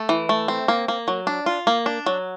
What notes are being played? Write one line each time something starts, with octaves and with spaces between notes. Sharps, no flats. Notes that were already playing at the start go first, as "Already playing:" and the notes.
Already playing: A3
E3
A3
C4
A#3
A#3
F#3
D4
F4
A#3
D4
F#3